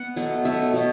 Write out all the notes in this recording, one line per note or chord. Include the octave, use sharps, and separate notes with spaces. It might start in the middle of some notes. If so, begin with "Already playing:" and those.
Already playing: B3 F#5
B2 F#3 A3
B2 F#3 A3 E5
B2 F#3